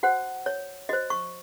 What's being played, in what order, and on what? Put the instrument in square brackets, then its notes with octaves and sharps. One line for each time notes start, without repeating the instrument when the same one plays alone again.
[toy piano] F#4 C5 F#5
C#5
F#4 C5 D#5
C#6